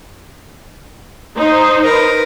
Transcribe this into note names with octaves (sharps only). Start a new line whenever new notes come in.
D#4 C5
A#4 B4